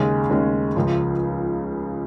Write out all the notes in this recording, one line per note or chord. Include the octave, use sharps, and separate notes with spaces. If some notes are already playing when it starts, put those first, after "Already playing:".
Already playing: D#2 C#3 G#3 C#4
D#2 C#3 G#3 C#4
C#2 C#3 F3